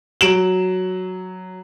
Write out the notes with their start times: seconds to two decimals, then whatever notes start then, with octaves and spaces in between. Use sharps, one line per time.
0.21 F#3 D7 E7 F#7